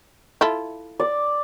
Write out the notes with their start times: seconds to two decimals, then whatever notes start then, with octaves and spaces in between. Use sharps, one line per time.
0.41 E4 F4 A4
0.99 D5